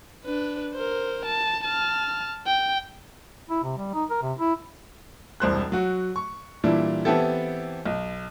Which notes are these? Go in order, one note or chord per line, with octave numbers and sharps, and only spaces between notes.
D4 B4
A#4 C5
A5
A5 F6
G5
E4
C3
G3
D#4
A#4
C3
E4
E1 C2 C5 F#6
F#3 F#4
C#6
A#2 E3 G3 D4 E4
E3 B3 C4 E4 G4 A4
B1